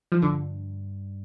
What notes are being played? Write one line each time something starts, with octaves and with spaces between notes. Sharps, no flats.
F3
G2 D3